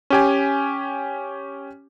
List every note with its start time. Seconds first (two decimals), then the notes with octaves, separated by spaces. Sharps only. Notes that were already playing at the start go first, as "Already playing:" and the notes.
0.10 C#4 G4 G#5